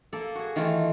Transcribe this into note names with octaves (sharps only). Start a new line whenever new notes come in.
A#3 A4
F#4 G#4
D#3 E3 A3 F4